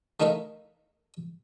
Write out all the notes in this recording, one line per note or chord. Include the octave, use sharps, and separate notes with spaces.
A3 D#4 E4 A#4 E5 F5